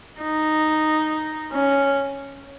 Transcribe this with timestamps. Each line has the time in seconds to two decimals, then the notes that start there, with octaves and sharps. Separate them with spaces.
0.22 D#4
1.52 C#4